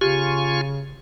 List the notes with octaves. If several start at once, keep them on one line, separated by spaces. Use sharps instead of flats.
C#3 F4 G4 G#5 C#6